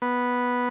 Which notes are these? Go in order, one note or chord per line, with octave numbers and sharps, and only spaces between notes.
B3